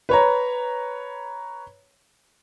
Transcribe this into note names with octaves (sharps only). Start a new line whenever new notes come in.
B4 C#5 A#5